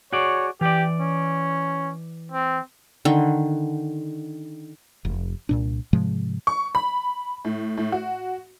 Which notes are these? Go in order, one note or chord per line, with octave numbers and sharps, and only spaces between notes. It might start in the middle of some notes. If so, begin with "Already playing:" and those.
F#4 G#4 C#5 D5
E3 G4 D5
C#4
C4
D3 D#3
F1
C2 A#2 D4
G#2 C3 F3 G#3
C#6
B5
A2
A2
F#4